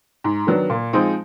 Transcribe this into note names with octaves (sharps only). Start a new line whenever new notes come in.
G#2
D#3 F#3 B3 D4
A#2
F3 G#3 C4 D#4